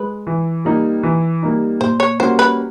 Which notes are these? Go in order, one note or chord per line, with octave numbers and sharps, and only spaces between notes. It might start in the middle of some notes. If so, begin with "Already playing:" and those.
Already playing: G#3 B4
E3
G3 A#3 D#4
E3
G3 A#3 D#4
A#2 C5
C#5
G3 A#3 C#4 F#4 C5
B4